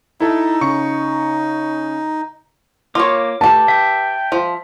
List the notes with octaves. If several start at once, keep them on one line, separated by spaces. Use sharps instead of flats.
D#4 E4 A4 E5
C#3 C#6 C#7
A#3 F4 C#5 D6
A3 G4 B4 A5
E5 G5
F3